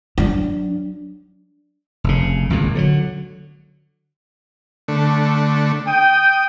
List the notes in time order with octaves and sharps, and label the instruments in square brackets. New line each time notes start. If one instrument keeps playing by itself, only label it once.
[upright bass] F#3 D4
[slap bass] F1 C#3
G#1 C#2 A#2
D3 F3 F#3
[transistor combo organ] D3 A3
[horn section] G5 [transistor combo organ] D#6